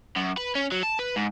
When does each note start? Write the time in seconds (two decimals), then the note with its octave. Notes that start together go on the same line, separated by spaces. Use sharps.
0.16 F#2
0.38 B4
0.55 C#4
0.72 F#3
0.83 A5
0.99 B4
1.16 G#2